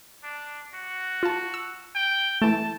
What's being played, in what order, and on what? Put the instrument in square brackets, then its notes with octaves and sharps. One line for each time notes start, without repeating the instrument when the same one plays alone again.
[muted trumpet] D4
F#4
[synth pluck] F4 A5
E6
[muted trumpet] G5
[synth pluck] E3 A3 [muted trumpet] A5